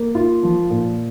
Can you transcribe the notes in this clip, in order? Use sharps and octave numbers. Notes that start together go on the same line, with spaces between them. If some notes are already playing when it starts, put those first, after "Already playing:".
Already playing: A#3
F4
F3
A#2